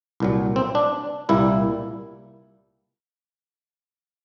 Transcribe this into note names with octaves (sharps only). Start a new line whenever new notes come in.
C2 A#2 F#3
C4
D4
C2 A#2 G3 A#3 E4